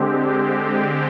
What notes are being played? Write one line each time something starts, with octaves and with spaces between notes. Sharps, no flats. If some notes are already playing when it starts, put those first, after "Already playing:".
Already playing: D3 G#3 C4 G4